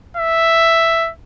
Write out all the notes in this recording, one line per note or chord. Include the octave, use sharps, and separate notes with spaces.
E5